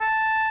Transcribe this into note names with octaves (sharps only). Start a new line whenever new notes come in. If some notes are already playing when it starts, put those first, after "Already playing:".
A5